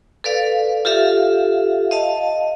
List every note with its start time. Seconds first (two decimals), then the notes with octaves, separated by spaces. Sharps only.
0.24 A4 B4 D5 F5
0.85 F4 G4 A4 E5 F5
1.91 D#5 F5 A5